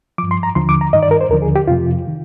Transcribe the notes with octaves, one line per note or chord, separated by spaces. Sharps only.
G2 F3 D6
C6
A#5
D#2 D3 F3 C6
D6
A#5
G2 D#3 D#5
D5
A#4
C5
D#2 D3 F3 A#4
G#4
G4
F2 C3 F3 F4
D#3